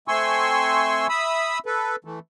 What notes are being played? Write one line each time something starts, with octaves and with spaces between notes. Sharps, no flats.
A3 C4 G#5 C6 C#6 E6
E5 B5 D#6 E6
A4 B4
E3 A3